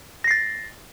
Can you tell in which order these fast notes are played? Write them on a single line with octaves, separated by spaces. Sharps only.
A#6 C7 A6